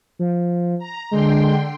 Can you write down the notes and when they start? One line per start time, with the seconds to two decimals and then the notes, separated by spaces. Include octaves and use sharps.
0.19 F3
0.79 A#5
1.11 D3 G#3 G5 C6